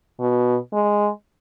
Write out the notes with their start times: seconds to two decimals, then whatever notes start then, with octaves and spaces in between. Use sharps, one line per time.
0.20 B2
0.73 G#3